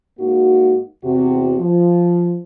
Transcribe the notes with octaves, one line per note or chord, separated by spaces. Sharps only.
G#2 A#3 D#4 F#4
E2 C3 F#4
F3